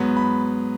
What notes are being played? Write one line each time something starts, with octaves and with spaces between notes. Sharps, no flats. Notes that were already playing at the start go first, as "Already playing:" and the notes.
Already playing: G#2 F#3 B3
B5